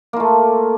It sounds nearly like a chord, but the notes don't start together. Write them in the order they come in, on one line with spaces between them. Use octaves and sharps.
A#3 F4 A3